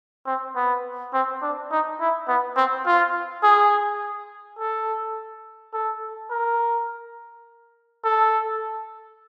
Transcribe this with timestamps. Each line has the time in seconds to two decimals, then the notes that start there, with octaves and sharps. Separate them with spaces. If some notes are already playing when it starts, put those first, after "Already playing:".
0.26 C4
0.56 B3
1.13 C4
1.42 D4
1.71 D#4
2.00 E4
2.28 B3
2.57 C4
2.86 F4
3.43 G#4
4.59 A4
5.74 A4
6.31 A#4
8.04 A4